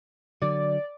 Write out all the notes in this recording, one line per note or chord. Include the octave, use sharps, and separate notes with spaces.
D3 F#3 D5